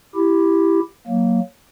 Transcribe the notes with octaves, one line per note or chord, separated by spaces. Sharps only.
E4 G4
F#3 A#3